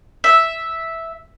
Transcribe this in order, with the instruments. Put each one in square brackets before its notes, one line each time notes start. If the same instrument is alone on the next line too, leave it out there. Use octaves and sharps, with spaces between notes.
[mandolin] E5